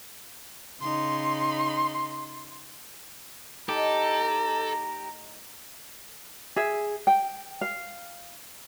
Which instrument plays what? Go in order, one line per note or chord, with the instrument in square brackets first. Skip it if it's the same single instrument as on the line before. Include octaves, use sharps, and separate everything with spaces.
[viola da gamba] C#3 D#4 [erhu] C6
[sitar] A2 D#4 [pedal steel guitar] G4 [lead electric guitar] A4 [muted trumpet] A#5
[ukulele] G#4 E5
G5
F5